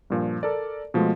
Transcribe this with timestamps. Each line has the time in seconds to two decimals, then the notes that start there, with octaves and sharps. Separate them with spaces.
0.10 G2 A#2 F3
0.43 A4 A#4 D5
0.94 B2 F3 G#3 A3 F4